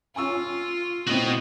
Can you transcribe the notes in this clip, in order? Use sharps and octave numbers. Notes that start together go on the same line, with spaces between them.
F4 G#5 C#6 E6
A2 C4 F#4 D#5